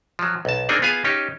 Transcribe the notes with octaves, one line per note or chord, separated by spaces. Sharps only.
F3 F#3
B1 A5
A#3 C4 D4 D#4 G#4
B3 F4 G#4 F5 G#5
C#4 D#4 G4